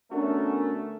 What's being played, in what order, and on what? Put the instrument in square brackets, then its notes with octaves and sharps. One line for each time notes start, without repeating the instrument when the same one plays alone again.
[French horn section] D3 B3 A#4 [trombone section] A3 [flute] C#4 [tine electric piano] D4 F#4